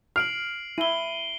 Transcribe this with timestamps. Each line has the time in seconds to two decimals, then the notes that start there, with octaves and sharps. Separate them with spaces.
0.16 F6 C7 D7 F#7
0.78 E4 D#7 G7